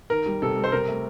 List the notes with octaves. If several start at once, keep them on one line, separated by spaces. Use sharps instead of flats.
D#3 A#4
G3
C3 A4
G3
C5
C3 A#4
A3